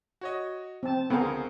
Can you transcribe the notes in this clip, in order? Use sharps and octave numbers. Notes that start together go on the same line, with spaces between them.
F#4 C#5 D#5
C4 A5
C#2 D3 B3 G#4 A#4 C5 F5